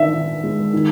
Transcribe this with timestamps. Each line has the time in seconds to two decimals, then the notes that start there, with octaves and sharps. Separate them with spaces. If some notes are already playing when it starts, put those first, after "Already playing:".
Already playing: D#3 D4 E5
0.14 D#3
0.44 G#3
0.73 D#3